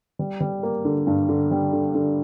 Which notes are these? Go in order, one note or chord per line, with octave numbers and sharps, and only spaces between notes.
G3
G3
A#3
D3
G2
D3
G3
D3
D3